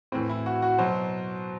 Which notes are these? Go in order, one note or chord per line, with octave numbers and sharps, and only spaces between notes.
A2 E3 C4
E4
F#4
F#4
B2 F#3 C5